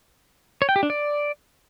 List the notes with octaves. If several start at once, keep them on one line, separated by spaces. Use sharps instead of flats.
C#5
G5
G4
D4
D5